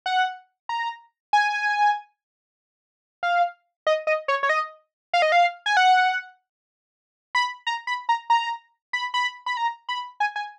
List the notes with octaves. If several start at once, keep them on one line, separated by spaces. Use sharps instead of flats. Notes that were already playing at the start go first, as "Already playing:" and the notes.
F#5
A#5
G#5
F5
D#5
D#5
C#5
C#5
D#5
F5
D#5
F5
G#5
F#5
B5
A#5
B5
A#5
A#5
B5
B5
B5
A#5
B5
G#5
G#5